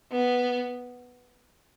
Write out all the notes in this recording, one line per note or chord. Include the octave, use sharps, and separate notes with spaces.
B3